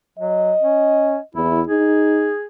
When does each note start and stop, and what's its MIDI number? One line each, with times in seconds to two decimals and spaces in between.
0.19 0.53 54
0.19 1.22 75
0.62 1.17 61
1.35 1.62 40
1.35 1.61 64
1.67 2.33 63
1.67 2.46 68